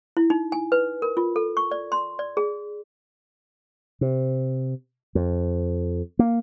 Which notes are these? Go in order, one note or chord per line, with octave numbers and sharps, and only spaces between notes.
E4
D#4
G#5
B4
A#4
F4
A4
C#6
D5
C6
D5
G#4
C3
F2
A#3